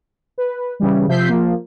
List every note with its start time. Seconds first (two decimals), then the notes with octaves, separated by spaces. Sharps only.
0.38 B4
0.80 C#3 E3 G3
1.08 C3 F3 E5 G6 B6 C7
1.29 F3 A#3